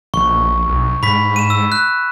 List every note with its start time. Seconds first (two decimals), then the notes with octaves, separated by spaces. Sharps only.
0.14 A#1 C#6
0.68 B1
1.03 G#2 B5 B6
1.36 D#7 E7
1.50 E6
1.72 F#6